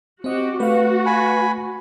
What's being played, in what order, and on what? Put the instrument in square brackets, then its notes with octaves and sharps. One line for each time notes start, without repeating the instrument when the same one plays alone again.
[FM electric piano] C4 D#5 [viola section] F#4 G4
[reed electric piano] A3 [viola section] F#4 [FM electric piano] B4 F5
[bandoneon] G#5 B5